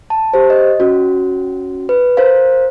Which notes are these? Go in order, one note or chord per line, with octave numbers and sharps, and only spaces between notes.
A5
G4 C5
D#5
C#4 F#4
B4
A#4 C5 F5